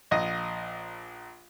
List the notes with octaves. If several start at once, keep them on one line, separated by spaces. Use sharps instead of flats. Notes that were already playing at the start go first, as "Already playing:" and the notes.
A#1 D#5